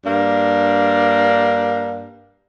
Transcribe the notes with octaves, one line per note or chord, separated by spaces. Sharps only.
G2 A#3 D4